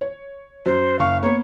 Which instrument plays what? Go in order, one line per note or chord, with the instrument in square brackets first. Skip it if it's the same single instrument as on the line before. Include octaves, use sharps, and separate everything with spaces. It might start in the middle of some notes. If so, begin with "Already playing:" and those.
[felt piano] C#5
[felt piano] F#2 [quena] C5
[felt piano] F#1 C#6 [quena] F5
[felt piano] A#3 B3 [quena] C#5